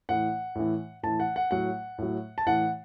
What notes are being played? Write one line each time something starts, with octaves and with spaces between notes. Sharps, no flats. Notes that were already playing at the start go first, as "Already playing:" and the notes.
A2 E3 F#5
A2 E3
A2 E3 A5
F#5
F#5
A2 F#3 F#5
A2 F#3
A5
A2 E3 F#5